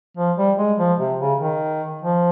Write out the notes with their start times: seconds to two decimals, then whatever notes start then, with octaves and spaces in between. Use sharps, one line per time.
0.17 F3
0.38 G3
0.59 G#3
0.79 F3
0.99 C3
1.20 C#3
1.40 D#3
2.02 F3